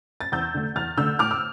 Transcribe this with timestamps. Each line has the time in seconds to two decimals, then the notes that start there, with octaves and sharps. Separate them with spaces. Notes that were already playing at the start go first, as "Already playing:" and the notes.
0.21 A6
0.32 E2 E6 G6
0.54 D3 A3
0.76 E2 F6 A6
0.97 D3 A3 E6 G6
1.19 A2 D6 F6
1.31 E6